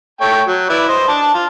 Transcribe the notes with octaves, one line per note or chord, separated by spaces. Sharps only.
A3 C#5 G5
F#3
E4 B4 D5
C5 D#5
D4 A5
F4